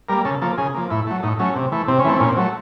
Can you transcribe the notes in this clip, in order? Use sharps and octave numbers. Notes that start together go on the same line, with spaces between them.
G3 A#3 A#4
C#3 A4
F3 A#3 A4
C#3 G#4
F3 A#3
A2 E4
F#3 A3
A2 D#4
F#3 A3 C#4
C3
E3 A3
C3 C4
C#4
E3 A3 C4
A#2 C#4
C4
F#3 A3